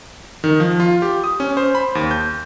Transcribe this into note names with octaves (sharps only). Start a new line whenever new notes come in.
D#3
F3
F4
G4
D#6
C#4
C5
B5
D#2
G6